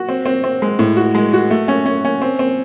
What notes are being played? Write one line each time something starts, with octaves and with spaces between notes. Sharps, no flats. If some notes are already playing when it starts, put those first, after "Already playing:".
Already playing: F#4
C4
C4
C4
G#3
A2
F#4
G#3
F#4
A3
C#4
C#4
C#4
C4
C4